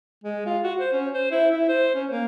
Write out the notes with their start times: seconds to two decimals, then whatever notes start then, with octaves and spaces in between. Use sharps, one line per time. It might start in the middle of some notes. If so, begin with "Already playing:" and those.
0.24 G#3
0.46 F4
0.64 F#4
0.80 C5
0.93 C#4
1.14 C5
1.31 E4
1.51 E4
1.69 C5
1.95 C#4
2.10 A#3